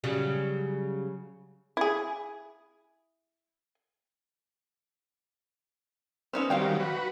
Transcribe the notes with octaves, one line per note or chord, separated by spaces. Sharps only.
C#3 F#3 G3
E4 G#4
B3 C#4 D#4 C5 E6 F6
D#3 F#3 G3 C4 F5 G5
F#4 B4